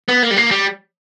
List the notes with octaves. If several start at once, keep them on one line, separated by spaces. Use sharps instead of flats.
B3
A#3
G3
A#3
G3